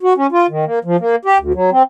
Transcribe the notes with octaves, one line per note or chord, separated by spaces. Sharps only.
F#4
C#4
F4
D#3
A#3
F3
A#3
G4
D2
F#3
C4